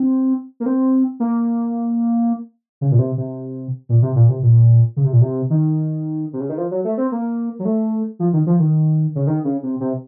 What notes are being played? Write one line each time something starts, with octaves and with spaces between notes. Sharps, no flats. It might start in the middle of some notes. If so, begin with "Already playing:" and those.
Already playing: C4
A#3
C4
A#3
C#3
A#2
C3
C3
A#2
C3
A#2
C3
A#2
C#3
C3
A#2
C3
D#3
C3
C#3
D#3
F3
F#3
A3
C4
A#3
F#3
A3
F3
D#3
F3
D#3
C#3
D#3
C#3
C3
C3